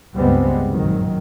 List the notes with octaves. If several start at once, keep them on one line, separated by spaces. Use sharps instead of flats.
C#2 G2 G3 G#3 B3 C4
A#1 F#2 D#3 F#3